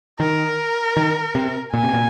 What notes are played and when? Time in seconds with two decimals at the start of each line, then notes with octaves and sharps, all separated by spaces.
0.20 D#3 A#4
0.97 D#3
1.35 C3
1.73 A#2 G#5
1.83 C3
1.93 A#2